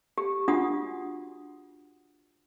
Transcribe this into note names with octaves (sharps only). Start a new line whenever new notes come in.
G4
D4 F4 F#4 F#5 D#6